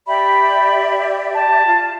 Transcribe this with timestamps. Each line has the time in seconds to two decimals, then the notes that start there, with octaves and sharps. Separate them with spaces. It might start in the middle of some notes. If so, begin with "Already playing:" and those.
0.07 G4 D5 E5 B5
1.34 A5
1.67 F4